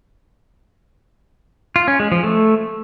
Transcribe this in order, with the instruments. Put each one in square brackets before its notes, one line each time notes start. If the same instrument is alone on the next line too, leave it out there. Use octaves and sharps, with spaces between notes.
[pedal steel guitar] F4
C#4
G#3
F3
A3